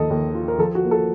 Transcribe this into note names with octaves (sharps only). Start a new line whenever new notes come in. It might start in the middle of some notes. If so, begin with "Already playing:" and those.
Already playing: D#2 D#3 F3 A4 D#5
D#2
F4
A#4
F3 A4
F#4
A#3
A4